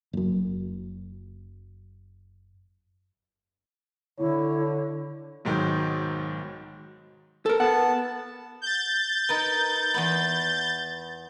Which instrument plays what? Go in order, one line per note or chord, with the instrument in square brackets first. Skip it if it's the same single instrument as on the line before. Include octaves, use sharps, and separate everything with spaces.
[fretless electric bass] F#1 F#2
[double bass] D3 [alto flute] E4 [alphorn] C#5
[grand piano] B1 G#2 D#3 F#3
[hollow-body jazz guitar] A4 A#4
[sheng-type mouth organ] B3 A5 [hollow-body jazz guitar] F#5
[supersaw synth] G6 A6
[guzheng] D#4 A#4 B4
E2 B3 B5